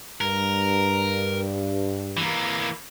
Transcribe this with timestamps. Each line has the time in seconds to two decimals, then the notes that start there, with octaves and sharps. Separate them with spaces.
0.21 G2 A#4
2.17 E3 A#3